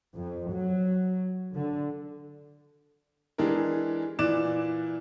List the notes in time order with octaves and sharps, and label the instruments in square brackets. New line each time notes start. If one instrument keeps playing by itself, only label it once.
[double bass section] F2
F#3
D3
[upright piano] E3 G#3 D4 G4 A#4
A#2 E3 D5 D6 F#6 E7